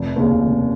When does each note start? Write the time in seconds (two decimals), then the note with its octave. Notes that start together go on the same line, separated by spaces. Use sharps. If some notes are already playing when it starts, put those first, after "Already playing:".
Already playing: F1
0.16 D#2 C#3
0.43 F1